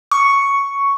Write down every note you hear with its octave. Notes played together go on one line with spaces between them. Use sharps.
C#6